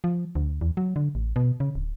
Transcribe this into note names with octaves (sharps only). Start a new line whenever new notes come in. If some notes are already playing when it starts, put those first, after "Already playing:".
F3
D2
E2
F#3
D3
A1
B2
C#3
D1